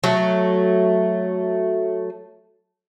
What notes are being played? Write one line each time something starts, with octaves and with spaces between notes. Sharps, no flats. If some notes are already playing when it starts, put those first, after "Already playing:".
F#3 A3